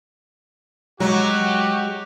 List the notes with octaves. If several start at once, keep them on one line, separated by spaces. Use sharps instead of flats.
F#3 G#3 F#4 G4